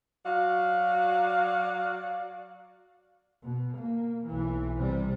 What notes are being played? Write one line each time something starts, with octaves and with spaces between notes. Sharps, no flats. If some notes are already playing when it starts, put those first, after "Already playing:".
F#3 F#4 D5 F5
B2
A#3
B1 E3
C3 G3